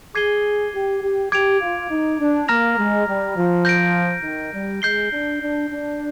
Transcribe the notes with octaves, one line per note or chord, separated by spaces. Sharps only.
G#4 D6 G#6 C7 D#7 G7
G4
G4
G4 D6 G#6 D7 F7
F4
D#4
D4
A#3 A#5 F6 A#6 F7
G#3
G3
F3
G6 A#6 D7
D#3
G3
G#3 G6 C7 G7
D4
D4
D4